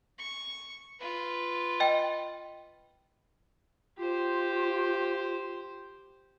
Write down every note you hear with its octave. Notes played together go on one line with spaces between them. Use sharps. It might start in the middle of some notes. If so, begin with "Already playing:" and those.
C#6
F4 B4
D#5 G5
F4 G4 C5